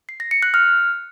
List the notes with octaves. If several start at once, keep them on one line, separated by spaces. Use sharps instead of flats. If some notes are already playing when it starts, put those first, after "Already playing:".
C7
A#6
C#7
F#6
F6